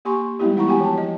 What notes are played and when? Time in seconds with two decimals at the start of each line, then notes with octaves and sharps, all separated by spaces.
0.05 A#3 G4 G#5 C6 C#6
0.39 G3 G#3 B3 D#4 E4 G4
0.56 E3 E4 F#5 A#5 C#6
0.67 B3 E4 F#4 G4 G5 G#5
0.81 F3 A5
0.98 D#5